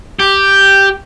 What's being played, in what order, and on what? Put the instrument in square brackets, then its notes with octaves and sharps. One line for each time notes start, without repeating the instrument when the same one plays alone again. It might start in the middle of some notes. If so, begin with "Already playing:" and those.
[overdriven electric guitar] G4